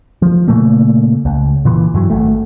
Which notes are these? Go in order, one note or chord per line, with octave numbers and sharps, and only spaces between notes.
F3
A#2 C#3 A3 A#3
C#2
A#2 E3
G2 E3 F#3
G#1 A3